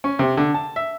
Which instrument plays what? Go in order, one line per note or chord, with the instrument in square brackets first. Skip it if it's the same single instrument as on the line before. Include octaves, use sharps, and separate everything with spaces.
[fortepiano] C#4
C3
D3
A5
E5